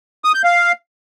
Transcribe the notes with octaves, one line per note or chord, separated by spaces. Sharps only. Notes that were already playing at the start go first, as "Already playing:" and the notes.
D#6
G6
F5